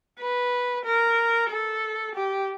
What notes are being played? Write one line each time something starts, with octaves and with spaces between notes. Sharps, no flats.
B4
A#4
A4
G4